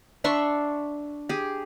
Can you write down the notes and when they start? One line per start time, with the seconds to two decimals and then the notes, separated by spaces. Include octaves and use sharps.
0.24 D4 E5 C6 C#6
1.29 G4 G#4